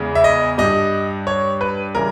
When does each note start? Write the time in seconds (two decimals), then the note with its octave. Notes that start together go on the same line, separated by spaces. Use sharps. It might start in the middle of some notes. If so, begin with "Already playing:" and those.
Already playing: E2 C#3 G#3
0.15 E5
0.24 D#5
0.58 G2 G3 D#5
1.27 C#5
1.61 B4
1.95 C#3 E3 G3 A#4